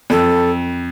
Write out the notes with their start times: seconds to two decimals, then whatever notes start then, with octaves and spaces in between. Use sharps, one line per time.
0.10 F2 A4